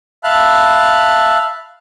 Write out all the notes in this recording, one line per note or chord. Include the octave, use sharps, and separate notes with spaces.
E5 F5 A5 B5 F6 F#6